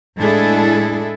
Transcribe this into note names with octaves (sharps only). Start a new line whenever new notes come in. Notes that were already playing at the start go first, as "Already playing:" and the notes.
A2 G#3 D4 E4 G#4 A4